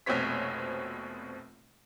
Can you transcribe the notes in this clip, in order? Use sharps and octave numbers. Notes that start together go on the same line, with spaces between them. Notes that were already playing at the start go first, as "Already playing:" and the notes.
F1 A#1 B2 C4 C#5 B6